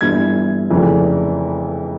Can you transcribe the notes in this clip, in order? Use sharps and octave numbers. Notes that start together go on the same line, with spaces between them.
G1 G2 E3 G#6
F1 F2 C#3 E3